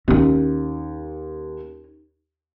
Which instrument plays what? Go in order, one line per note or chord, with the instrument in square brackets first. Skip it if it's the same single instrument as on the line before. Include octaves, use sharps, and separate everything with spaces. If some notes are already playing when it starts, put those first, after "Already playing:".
[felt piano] D#2 [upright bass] C#4 D#4